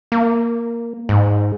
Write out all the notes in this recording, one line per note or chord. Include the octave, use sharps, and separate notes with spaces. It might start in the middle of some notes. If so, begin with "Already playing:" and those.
A#3
G#2